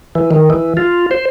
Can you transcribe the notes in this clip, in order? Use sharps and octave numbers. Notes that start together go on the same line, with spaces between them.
E3
D#3
E3
F4
C5